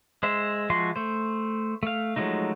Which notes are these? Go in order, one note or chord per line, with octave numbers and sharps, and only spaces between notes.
G#3 C5 E5
F3 G#3 F#4 E5 C6
A3 C5
A3 F5
F3 F#3 G#3 A3 D#4